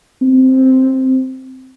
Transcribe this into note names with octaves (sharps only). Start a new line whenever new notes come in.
C4